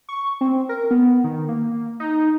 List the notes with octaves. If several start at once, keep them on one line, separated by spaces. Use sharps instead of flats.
C#6
C4
A#4
B3
D#3
A#3
D#4